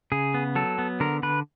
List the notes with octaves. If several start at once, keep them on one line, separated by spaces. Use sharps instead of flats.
C#3 G#4
B3
F#3 A4
B3
D3 A#4
D3 B4